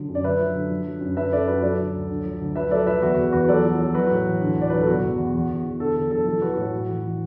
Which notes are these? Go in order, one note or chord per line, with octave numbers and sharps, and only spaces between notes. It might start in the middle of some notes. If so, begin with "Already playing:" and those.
Already playing: D3 F#3
F#2
D5
D3 B4 E5
F#3
D3
F#3
F#3
F#2
F#2 B4 E5
F#2 A4 D5
F#2 F#4 B4
B4
F#3 A4 D5
D3
D2
D3
F#3
D2
F#3 B4 E5
F#3 A4 D5
F#3 B4 E5
E2 F#4 B4
E2
E2 F#4 B4
F#3 A4 D5
F#3
F#3
E3 F#4 B4
A2
E3
D3
D2
D5
F#3 B4
A4
B2 F#4
E2
E2
E3
E2
E2
D3 A4
D3 A4
F#3 A4
E3 A4
E3 F#4 B4
A2 F#4
A2
E3
E3